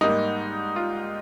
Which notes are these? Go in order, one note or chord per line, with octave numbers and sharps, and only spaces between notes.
G#2 G3 A#3 D#4
F4